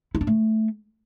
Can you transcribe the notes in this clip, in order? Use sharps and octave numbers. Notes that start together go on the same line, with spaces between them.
E4
D4
A3